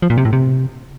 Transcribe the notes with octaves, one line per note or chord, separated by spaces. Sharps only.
F3
A#2
C3
A2
C3